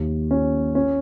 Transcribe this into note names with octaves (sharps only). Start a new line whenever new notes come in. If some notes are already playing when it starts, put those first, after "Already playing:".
Already playing: D#2
C#4
C#4